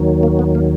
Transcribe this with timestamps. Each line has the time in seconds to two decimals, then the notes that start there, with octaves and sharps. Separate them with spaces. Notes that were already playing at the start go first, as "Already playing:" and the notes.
Already playing: D#2 D#3 F#3
0.23 A#3
0.39 B3
0.55 A#3